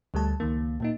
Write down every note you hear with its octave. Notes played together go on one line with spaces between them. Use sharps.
D2 G3 A3 A5
C#2 D#3 A#3
A#2 A#3 D#4